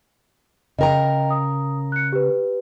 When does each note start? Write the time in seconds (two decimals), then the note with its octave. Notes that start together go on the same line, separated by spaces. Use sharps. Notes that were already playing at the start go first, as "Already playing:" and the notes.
0.79 C#3 A#4 D#5 G5 A#5
1.30 D#6
1.92 F#6 C#7
2.12 G4 B4